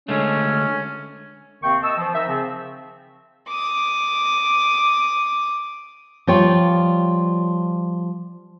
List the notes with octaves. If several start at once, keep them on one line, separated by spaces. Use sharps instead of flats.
D3 G#3 A3 C#4
D#2 C3 D#3 C4 G5 C#6
D#5 A5 C#6 E6
E3 F3
D#3 D#4 E5
C#3 F3 C4
D6 D#6
F3 G3 F4 C#5 D5 G5